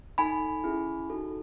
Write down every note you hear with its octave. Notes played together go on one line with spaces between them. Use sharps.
D#4 A4 G#5 B5
C#4 E4 G#4
D#4 F#4 A4